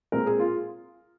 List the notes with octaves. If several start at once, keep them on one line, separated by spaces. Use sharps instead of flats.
A#2 G#3 C4 A#4
G#4
F4